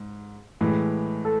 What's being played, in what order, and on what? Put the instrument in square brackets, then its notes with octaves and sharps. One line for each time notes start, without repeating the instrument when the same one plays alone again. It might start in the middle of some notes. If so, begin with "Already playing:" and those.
Already playing: [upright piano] G#2
A2 E3 G#3
[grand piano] A4